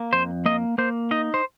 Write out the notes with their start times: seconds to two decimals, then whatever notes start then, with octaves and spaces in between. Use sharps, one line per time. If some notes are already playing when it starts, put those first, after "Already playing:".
Already playing: A#3
0.13 F2 C5
0.46 A#3 D#5
0.78 A#3 C5
1.11 D#4 D#5
1.34 C5